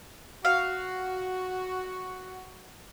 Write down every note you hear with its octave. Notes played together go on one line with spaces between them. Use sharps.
F#4 F5